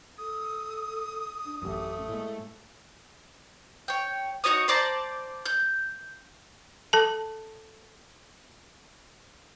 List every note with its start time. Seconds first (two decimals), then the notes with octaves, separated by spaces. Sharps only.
0.18 A4 D#6
1.45 D4
1.62 A1 F#2 A3 G4
2.08 A2 G#3 A#3
3.88 C#5 G5
4.44 D#4 F#4 C#5 D#6
4.68 C5 D5 A5 A#5
5.46 G6
6.93 A4 A5